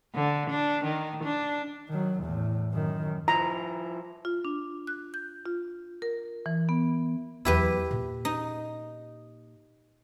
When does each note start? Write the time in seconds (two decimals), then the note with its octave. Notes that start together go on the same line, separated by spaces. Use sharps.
0.14 D3
0.50 D4
0.85 D#3
1.23 D4
1.89 D#3 F#3
2.21 E2 A2
2.72 F#2 D#3
3.28 F3 E4 A#5
4.25 F4
4.45 D4
4.87 F#6
5.14 G6
5.46 F4
6.02 A#4
6.46 E3
6.69 B3
7.45 E2 F#3 E4 G4 B4
7.91 A#2
8.25 D#4